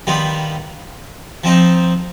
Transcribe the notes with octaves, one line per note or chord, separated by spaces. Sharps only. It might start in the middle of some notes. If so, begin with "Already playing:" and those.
D#3 G3 B3 F4
F3 C4 D#4